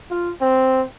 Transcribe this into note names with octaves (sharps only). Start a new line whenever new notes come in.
F4
C4